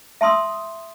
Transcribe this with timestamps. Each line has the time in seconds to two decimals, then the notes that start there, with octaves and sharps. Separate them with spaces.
0.21 E5 A5 C6 D#6 E6